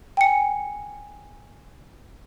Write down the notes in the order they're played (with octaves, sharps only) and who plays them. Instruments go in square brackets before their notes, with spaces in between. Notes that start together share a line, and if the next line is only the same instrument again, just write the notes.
[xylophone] G5 G#5 C#7